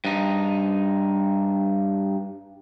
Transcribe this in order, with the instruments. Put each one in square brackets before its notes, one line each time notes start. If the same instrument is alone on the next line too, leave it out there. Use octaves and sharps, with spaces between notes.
[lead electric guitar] G2 D#4